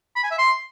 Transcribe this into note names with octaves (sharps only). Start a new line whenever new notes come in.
B5
G#5
E5
C6